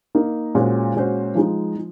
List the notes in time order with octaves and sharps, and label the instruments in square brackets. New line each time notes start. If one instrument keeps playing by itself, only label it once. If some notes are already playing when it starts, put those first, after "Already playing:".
[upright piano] A#3 D#4 A#4
A#2 G#3 C#4 F#4 C5
A#2 G#3 C#4 F#4 C5
F3 G#3 D#4
F3